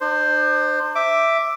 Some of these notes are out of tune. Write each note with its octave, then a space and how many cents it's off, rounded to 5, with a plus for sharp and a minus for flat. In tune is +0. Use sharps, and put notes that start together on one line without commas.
D4 +40 C5 +0
E5 +0 D6 +0